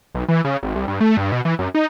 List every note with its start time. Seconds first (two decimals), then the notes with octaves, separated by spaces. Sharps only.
0.15 B1
0.29 E3
0.45 C#3
0.63 G#1
0.75 C2
0.88 G2
1.01 A3
1.17 G2
1.32 B2
1.45 E3
1.59 F#2
1.75 D#4